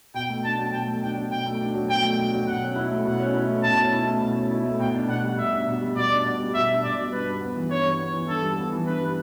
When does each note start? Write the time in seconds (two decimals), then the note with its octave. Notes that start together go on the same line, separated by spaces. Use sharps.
0.14 B2 G5
0.29 A3
0.43 D4 A5
0.58 F#3
0.72 B2 G5
0.87 A3
1.01 D4 G5
1.16 F#3
1.31 B2 G5
1.46 A3
1.60 D4
1.74 F#3
1.88 B2 G5
2.04 A3
2.18 D4
2.32 F#3
2.47 B2 F#5
2.62 C#4
2.76 E4
2.91 A3
3.05 B2 F#5
3.20 C#4
3.34 E4
3.48 A3
3.63 B2 A5
3.78 C#4
3.93 E4
4.07 A3
4.22 B2
4.36 C#4
4.51 E4
4.65 A3
4.80 B2 G5
4.94 D4
5.08 B2 F#5
5.24 G3
5.38 B2 E5
5.52 D4
5.67 B2
5.81 G3
5.95 B2 D5
6.10 D4
6.25 B2
6.40 G3
6.54 B2 E5
6.69 D4
6.83 B2 D5
6.97 G3
7.12 G2 B4
7.27 G3
7.41 B3
7.55 E3
7.70 G2 C#5
7.85 G3
7.99 B3
8.13 E3
8.28 G2 A4
8.43 G3
8.58 B3
8.72 E3
8.86 G2 B4
9.01 G3